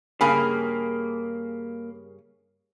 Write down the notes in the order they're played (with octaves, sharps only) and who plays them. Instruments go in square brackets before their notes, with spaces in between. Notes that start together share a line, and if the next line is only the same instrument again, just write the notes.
[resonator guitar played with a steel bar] G2 C#3 G#4 [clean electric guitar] A#3 [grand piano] B5